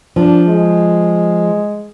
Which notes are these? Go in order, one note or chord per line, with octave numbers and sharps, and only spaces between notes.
F3 D4
G#3